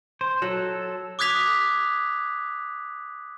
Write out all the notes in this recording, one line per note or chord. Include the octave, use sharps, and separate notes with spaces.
C5
F#3 A4
D6 D#6 F#6 G#6 B6 F7